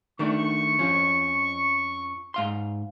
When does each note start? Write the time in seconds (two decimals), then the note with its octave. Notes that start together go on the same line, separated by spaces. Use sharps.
0.19 D#3 A3 D4 C#6
0.79 F2 F3 C#4
2.34 G#2 F5 C6